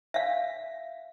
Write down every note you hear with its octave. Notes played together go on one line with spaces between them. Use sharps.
E5 F5